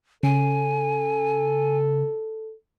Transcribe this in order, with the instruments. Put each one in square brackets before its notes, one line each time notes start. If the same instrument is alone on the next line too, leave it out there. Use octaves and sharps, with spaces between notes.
[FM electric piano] C#3 [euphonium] A4 [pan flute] G#5